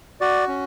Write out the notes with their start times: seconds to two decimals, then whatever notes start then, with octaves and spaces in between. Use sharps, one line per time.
0.21 F#4 D5
0.48 C#4